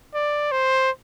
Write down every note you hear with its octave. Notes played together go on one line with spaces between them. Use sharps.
D5
C5